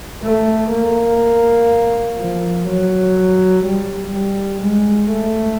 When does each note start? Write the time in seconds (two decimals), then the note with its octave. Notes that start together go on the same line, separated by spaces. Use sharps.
0.23 A3
0.72 A#3
2.18 F3
2.68 F#3
3.66 G3
4.14 G3
4.63 G#3
5.12 A3